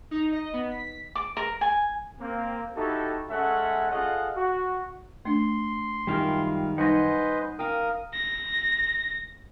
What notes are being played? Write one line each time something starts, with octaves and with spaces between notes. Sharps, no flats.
D#4
D#5
B3
B6
D6
A#4
G#5
A#3 C4
D#4 E4 F#4 G4 A4
G#3 C#4 A4 E5 F#5
F4 G#4 A4 D#5 F5 F#5
F#4
A3 D4 C6
F#2 D#3 G3 E4 F4 G5
G3 D#4 B4 C5 D#5 F#5 G#5 A#6
A#4 F5 G5 D#6
A#6